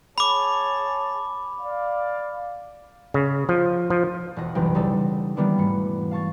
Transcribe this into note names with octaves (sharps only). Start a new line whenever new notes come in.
G#4 C#5 A5 B5 D6
D5 F5
C#3
F3
F3
E1 A4 D#5 F#5 A#6
F#1 C2 B2 E3 D#4 G5
C#3 G3 D#4 A4
D#3 E3 G3 A#3 B3 D4
E1 G#2 A3 C#7
F5 A5 C#6 A6